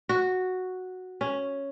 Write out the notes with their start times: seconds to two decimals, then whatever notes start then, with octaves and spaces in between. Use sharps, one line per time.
0.09 F#4
1.21 C#4